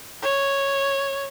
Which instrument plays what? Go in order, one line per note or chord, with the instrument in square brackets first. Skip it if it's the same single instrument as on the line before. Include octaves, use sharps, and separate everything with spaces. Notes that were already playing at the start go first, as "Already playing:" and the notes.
[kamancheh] C#5